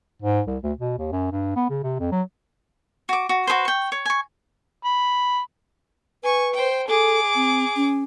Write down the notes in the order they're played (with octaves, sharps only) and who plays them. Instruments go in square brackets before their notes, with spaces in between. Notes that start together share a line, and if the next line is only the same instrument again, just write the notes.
[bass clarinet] G#2
C2
D2
B2
D#2
F#2
G2
B3
C#3
C3
F2
F#3
[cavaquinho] F#4 D6
F#4
F#4 G#4 B4 C5
G5 C#6
C#5
G#5 C#6
[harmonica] B5
[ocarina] B4 [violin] G#5 C#6
[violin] C5 G5
[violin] G#4 D6 [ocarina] A4
[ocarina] C4
C#4